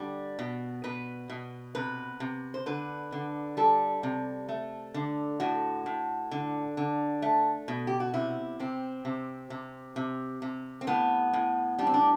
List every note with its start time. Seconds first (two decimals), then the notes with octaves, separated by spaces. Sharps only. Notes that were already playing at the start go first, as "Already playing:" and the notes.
Already playing: D3 G3
0.39 B2
0.84 B2 B4
1.30 B2
1.75 C3 B4
2.20 C3
2.54 C5
2.66 D3 B4
3.12 D3
3.57 G3 A4
4.03 C3
4.49 A3
4.94 D3
5.40 A2 F#4
5.86 A2
6.31 D3
6.77 D3
7.22 A3
7.68 B2
7.87 G4
8.00 F#4
8.14 C3 E4
8.59 C3 C4
9.05 C3
9.50 C3
9.96 C3
10.42 C3
10.81 C4
10.87 A2 B3
11.33 A2
11.79 G3 D4
11.87 C4
11.94 D4